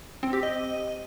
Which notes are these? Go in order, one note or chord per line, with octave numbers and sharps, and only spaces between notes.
C4
G4
D#5